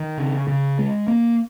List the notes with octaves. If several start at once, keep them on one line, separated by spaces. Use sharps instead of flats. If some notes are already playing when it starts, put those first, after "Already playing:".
Already playing: D#3
C#3
C#3
G#3
A#3